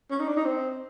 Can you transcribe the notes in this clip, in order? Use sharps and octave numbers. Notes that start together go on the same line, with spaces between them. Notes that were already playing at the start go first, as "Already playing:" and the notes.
C#4
D#4
D4
D#4
C4